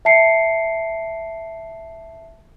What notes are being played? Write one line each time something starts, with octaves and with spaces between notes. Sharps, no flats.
E5 A5 C7 C#7